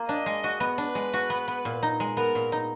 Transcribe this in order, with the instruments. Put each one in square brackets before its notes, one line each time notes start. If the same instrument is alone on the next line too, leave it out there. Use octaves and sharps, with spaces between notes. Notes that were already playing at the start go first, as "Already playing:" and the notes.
Already playing: [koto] A#3 F4
[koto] D4 [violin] D#5
[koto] G#3
F#4
B3
[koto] D4 [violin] B4
[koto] G#3
F#4
B3
B3
A#2
D#4
G#3
[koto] B3 [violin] A#4
[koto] A#2
D#4